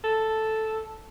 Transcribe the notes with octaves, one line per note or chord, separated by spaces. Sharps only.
A4